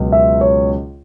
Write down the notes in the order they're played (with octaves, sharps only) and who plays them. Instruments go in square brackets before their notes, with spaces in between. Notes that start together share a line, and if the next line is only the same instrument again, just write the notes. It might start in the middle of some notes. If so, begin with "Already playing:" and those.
Already playing: [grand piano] C#2 B2 F#3
E5
C#5